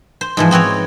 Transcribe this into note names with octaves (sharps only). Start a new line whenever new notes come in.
C5
G#2 E3 F3
B3 C4 F#4 C#5